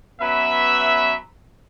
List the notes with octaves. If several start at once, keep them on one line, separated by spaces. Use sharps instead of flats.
F#3 B3 C#4 B4 E5